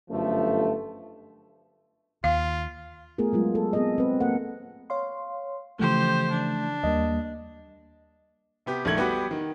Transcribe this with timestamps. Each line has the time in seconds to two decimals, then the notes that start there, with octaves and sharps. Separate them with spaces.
0.10 G1 F#2 F3 A3
2.24 D#2 F4 F5
3.18 A3 B3 F4 G#4 A#4
3.33 F#3 G#3 F4
3.55 A4
3.73 B3 C4 G#4 A4 D#5
3.98 C4 B4
4.20 A#3 A4 A#4 F#5
4.90 C#5 F5 C6
5.79 C#3 E3 F3 A3 G4 C5
6.31 D4
6.84 D#2 G3 A#3 D#5
8.66 C3 B3 G4
8.85 A#1 D#3 A3 G#6 F#7
8.97 G3 B3 F#4 G4 B4
9.31 D#3